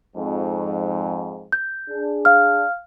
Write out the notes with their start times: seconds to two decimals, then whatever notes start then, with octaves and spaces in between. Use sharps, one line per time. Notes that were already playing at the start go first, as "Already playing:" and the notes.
0.15 F2 G#2
1.52 G6
1.89 D4 G#4
2.25 F5 F6